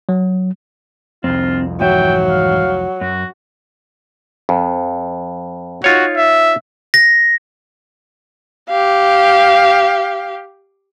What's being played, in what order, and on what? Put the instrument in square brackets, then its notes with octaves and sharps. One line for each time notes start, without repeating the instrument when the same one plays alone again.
[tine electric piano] F#3
[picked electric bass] C2 F2 [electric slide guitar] C4 [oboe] F4
[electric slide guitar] G#2 E3 E5 [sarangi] F#3 [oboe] G5
[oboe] F5
[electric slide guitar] F#2 [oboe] F#4
[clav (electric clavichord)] F2
[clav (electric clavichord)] D#4 F4 C#5 [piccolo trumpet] F#4
[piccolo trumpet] E5
[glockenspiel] A#6
[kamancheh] G4 F5